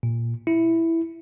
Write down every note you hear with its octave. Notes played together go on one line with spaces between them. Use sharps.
A#2
E4